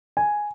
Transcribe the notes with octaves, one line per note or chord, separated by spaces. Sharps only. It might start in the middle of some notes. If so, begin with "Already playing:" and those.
G#5